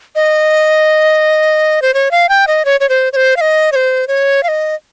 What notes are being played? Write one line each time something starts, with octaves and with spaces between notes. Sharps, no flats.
D#5
C5
C#5
F5
G5
D#5
C#5
C#5
C5
C#5
C5
F5
D#5
C#5
C5
C#5
F5
D#5